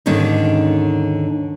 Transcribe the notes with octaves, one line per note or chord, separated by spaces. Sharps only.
D#2 G#2 D3 D#3 C#4